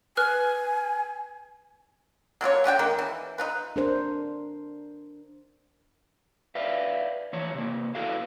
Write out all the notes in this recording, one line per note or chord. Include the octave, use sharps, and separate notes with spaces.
B4 G#5 F6 F#6
F#3 A#3 F4 C#5
C#4 F4 F#4 G5
D#3 G#3 A#3
E3
D#4 F4 B4
D4 A#4 C5
B4 D5 E5 F5
E3 F3 C#5
C3 A#3
E4 F#4 A4 B4 F5